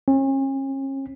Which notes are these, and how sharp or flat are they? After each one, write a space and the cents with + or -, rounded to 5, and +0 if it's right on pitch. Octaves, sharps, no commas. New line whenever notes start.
C#4 -40